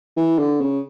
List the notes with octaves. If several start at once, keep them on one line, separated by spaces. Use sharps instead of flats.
E3
D3
C#3